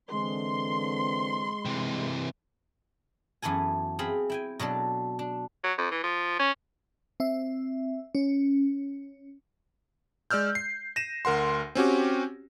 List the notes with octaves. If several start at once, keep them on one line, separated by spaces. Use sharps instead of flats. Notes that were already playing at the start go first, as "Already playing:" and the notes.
D3 E3 G#3 C4 C6
C3 E3
F#2 E3 B3 A4 G#5
C4 G#4 E5 F5 B5
E4 G5 G#5
B2 F#3 D4 A4
D4
F#3
F2
E3
F3
C#4
C4 E5
C#4
G#3 D5 E6 F6 G6
C7
A#6 D#7 E7
D2 A#4 F#5 C6
C4 C#4 F#4 G4